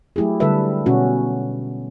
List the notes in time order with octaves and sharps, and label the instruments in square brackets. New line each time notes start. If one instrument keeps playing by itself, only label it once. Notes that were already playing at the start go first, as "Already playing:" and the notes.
[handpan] F#3 A3 E4 G4 G#4
D3 G3 A4 B4 E5
B2 C#4 F#4